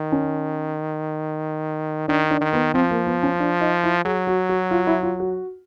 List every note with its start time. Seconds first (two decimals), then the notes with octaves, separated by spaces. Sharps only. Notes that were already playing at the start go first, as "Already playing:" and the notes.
Already playing: D#3
0.12 C#4
2.08 D#3 D4
2.31 D4
2.41 D#3
2.53 B3
2.74 F3 C4
2.91 A#3
3.07 B3
3.23 C#4
3.40 D4
3.61 D#4
3.84 E4
4.05 F#3 G#4
4.27 F#4
4.49 F#4
4.71 F4
4.87 E4
5.03 F4
5.20 F#4